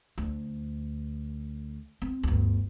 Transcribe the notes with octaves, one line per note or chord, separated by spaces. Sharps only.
D2
C4
G1 D2